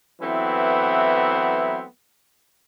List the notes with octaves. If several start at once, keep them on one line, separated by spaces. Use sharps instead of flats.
E3 F#3 A3 B3 C4 E4